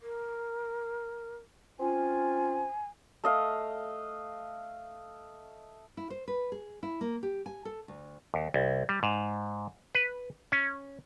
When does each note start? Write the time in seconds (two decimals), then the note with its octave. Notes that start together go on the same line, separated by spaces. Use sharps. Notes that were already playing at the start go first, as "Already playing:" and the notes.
0.01 A#4
1.80 C4 C#4 F4 G#5
3.24 A3 D#5 F5
5.97 E4
6.10 C5
6.28 B4
6.52 G#4
6.83 E4
7.01 A#3
7.23 G4
7.46 G#5
7.65 A4
7.88 D2
8.34 D#2
8.54 C2
8.89 G3
9.03 G#2
9.95 B4
10.52 C#4